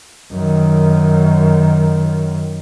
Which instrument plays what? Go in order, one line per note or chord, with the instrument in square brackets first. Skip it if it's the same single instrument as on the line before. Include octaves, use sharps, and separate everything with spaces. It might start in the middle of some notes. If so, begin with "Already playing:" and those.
[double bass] F#2 D#3